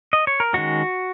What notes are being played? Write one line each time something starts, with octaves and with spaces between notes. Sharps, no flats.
D#5
C#5
A#4
D#3 G#3 C#4 F#4